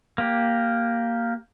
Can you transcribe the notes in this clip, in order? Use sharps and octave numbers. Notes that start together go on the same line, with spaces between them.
A#3 G4